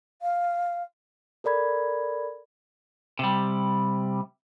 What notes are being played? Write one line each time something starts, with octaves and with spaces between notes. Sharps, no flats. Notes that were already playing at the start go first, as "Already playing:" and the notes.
F5
A4 A#4 D5 B5 G#6
C3 G3